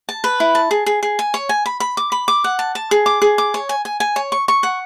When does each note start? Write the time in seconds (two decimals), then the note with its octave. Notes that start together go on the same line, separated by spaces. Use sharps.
0.09 A5
0.24 B4
0.40 E4
0.55 A5
0.71 G#4
0.86 G#4
1.03 G#4
1.19 G#5
1.34 C#5
1.49 G#5
1.66 B5
1.80 B5
1.97 D6
2.12 B5
2.28 D6
2.44 F#5
2.59 A5
2.75 A5
2.91 G#4
3.06 D6
3.22 G#4
3.38 D6
3.54 C#5
3.69 G#5
3.85 G#5
4.00 G#5
4.16 C#5
4.32 C#6
4.48 C#6
4.63 F#5